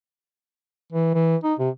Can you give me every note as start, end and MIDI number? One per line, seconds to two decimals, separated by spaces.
0.92 1.09 52
1.14 1.36 52
1.44 1.54 63
1.59 1.69 48